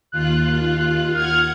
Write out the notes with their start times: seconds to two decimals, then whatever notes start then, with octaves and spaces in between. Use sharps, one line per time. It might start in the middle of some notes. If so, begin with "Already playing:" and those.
0.12 D#2 F4 F#6
1.15 F#5 F6 G#6